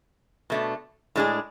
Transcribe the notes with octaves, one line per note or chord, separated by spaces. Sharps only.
B2 A3 D4
A2 G#3 D4 G#4